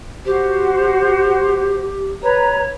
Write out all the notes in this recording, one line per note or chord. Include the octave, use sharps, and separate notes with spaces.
F#4 G4 C5
B4 C#5 A#5